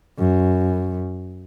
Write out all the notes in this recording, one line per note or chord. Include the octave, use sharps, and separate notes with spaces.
F#2